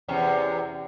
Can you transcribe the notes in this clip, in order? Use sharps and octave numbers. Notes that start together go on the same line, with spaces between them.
E2 C3 C#4